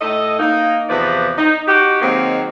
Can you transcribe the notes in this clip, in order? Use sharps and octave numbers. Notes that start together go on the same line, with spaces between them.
A2 A4 D#5
A#3 D#4
E2 C3 F3 B4 D5
D#4
D#4 F#4 G4
D#3 F#3 G#3 A#3 C4